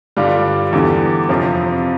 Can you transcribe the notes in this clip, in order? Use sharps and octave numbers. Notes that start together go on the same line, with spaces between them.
G2 D3 G3 D4 F4
E2 D3 G3
F2 C3 F3